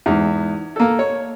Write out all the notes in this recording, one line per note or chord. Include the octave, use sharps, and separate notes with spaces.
E2 G#2
A#3 A4
C#5